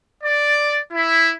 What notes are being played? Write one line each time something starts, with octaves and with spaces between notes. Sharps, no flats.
D5
E4